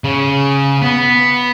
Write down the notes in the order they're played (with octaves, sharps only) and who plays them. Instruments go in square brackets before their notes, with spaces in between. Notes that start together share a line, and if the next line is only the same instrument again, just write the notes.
[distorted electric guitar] C#3
B3